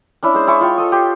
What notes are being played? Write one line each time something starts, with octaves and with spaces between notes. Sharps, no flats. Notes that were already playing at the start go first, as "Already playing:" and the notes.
C#4 D4 E4
G#3 C5
E4 G#4 C#6 D6
F4 C#5 G5
A4 D#5
G4 C6